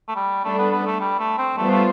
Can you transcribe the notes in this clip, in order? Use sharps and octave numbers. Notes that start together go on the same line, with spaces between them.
A3
G3
G3 A3 D4 A4
B3
B3
A3
G3
A3
C4
G3 A3 B3 F4 C5
A3